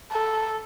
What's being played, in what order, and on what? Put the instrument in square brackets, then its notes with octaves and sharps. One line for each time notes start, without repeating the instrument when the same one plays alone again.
[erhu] A4